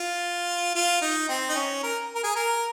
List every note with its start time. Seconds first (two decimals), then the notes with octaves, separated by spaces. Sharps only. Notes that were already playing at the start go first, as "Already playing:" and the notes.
Already playing: F4
0.75 F4
1.02 D#4
1.28 C4
1.49 D#4
1.55 C#4
1.83 A#4
2.15 A#4
2.23 G#4
2.36 A#4